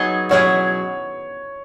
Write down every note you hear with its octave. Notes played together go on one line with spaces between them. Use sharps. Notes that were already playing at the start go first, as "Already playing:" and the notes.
Already playing: F#3 B3 D#4 G#4 D#5
B2 F#3 C#4 E4 G#4 C#5